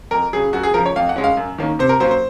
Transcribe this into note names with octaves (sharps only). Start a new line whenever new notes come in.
F2 A#4
C#3 F#3 G#4
F#2 F#4
G#4
C#3 F3 A#4
C#5
F2 F5
F#5
C#3 G#3 C#4
F5
F#2
D#3 A#3 C#4
C3 C5
A#4
F#3 A#3 C#4 C5
C5